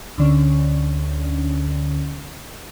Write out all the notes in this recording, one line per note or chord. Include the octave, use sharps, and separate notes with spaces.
D2 D3 C#4